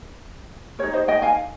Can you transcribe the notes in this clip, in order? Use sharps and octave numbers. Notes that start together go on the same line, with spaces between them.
D#4 G4 A#4 C#5
C5 D#5
D#5 G5
F5 G#5